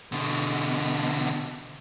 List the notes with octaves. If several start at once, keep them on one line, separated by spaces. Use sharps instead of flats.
B2 D3